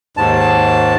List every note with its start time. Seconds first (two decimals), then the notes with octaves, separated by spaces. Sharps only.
0.17 D#2 G#2 A5